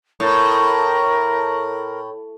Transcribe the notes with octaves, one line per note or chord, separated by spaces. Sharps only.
A2 A#4